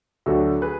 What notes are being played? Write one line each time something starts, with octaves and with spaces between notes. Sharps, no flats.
D2 D3 F#3 F#4 A4
G#4 B4